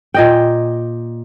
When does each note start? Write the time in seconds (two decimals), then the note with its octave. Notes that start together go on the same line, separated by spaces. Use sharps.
0.14 A#2 D#5 G5